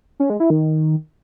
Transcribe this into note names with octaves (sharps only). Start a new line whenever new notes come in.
C#4
G#3
E4
D#3